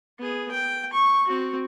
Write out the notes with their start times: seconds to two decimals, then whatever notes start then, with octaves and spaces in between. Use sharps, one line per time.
0.19 B3 G#4
0.51 G5
0.93 C#6
1.28 C4 F#4